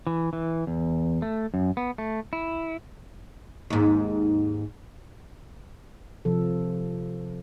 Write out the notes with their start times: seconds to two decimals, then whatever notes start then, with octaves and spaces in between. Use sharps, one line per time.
0.07 E3
0.33 E3
0.67 E2
1.22 A3
1.54 F#2
1.77 B3
1.98 A3
2.33 E4
3.70 D#2 G#2
6.25 C3 F3 A4